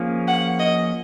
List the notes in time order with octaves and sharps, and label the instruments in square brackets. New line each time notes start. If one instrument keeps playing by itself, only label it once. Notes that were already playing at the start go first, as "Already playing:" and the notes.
Already playing: [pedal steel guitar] F3 A#3 C#4 G#4
[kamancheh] F#5
D#5